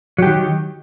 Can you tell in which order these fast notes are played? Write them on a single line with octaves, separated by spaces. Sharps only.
F#3 G4 D#3